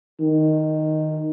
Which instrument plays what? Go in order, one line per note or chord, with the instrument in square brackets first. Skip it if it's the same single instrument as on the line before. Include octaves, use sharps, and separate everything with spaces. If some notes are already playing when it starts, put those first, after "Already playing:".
[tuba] D#3